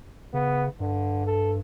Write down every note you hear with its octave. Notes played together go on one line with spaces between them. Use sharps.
C#3 B3
G2 D3
A4